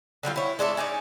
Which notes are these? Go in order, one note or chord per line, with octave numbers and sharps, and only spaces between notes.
D3 F#3 G3 F4
E4 C#5
G#3 D4 E4 A4
C#4 D#4 C#5 D5